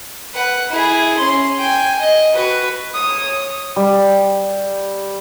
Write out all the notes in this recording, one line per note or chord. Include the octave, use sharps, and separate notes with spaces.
B4 F#5
E4 G#4
C#4 C6
G5 G#5
D#5
F#4 B4
C#5 D#6
G3